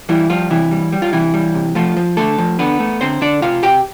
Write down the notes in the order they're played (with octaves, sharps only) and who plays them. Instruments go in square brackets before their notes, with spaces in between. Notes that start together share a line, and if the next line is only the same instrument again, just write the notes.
[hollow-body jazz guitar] E3 G3 E4
F3 G3 F4
C3 E3 E4
G3
G3
F4
C3 E3 E4
G3
C3
F3 A3 F4
F3
D3 A3 A4
F3
D3 B3 B4
A3
D3 C4 C5
D3 D4 D5
C3 F4 F5
C3 G4 G5